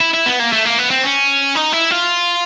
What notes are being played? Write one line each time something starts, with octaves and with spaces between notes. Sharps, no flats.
E4
E4
B3
A#3
A3
A#3
B3
C4
C#4
D#4
E4
F4